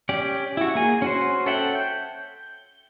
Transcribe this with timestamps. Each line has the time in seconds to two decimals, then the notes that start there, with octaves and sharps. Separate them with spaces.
0.09 C#4 G4 D5
0.57 E4 F#4
0.75 A#3 G#4 G#5
1.02 C#4 F#4 C5
1.46 A4 C#5 E5 F#5 G5
1.75 G6